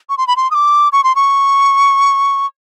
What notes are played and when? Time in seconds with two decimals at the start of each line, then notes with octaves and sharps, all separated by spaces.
0.09 C#6
0.18 C6
0.27 B5
0.36 C6
0.51 D#6
0.55 D6
0.92 C#6
1.04 C6
1.16 C#6